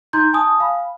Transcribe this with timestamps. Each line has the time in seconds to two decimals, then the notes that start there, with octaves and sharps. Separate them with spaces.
0.13 D#4 A#5 C6 G6 G#6
0.33 G#5 A5 D#6
0.60 F5 B5